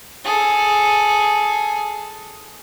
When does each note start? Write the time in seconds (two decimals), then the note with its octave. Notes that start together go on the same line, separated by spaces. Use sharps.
0.24 G#4 A4